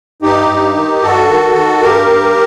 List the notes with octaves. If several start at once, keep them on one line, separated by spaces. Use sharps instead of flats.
G2 D#4 G4
G2
D#3
G2 F#4 A4
D#3
D#3
G2 G4 A#4
G2